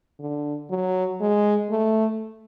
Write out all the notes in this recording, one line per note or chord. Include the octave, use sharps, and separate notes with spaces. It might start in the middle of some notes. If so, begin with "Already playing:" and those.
D3
F#3
G#3
A3